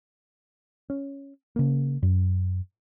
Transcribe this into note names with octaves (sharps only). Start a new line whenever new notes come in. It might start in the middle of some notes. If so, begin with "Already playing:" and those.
C#4
C#3 A#3
F#2